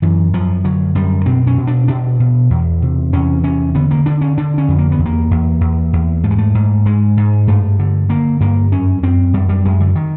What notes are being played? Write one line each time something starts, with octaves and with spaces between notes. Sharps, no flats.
F#2 E3
F#2 F3
D3 F#3
F#2 G3
B2 C4
C#4
B2
D4
B2 D4
B2
E2
C3
E2 C#4
C3 C#4
D3 B3
A#3
D3 D4
C#4
D3 D4
C#4
F2
A#3
B3
E2
A#3
E2
E2
E2
G#2 A3
G#3
A3
G#2
G#2 G#3
G#2
G2 A3
D3
D3 A#3
G2 A#3
F#2 C#4
F#2 C4
F#2 G3
G3
F#2 G#3
D3
D#3